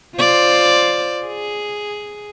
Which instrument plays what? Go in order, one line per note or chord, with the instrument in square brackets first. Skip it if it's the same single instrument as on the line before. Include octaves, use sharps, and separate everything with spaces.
[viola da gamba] F4 C5 D5
G#4